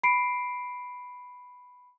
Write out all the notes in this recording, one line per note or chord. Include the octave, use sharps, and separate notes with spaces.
B5 C7 D7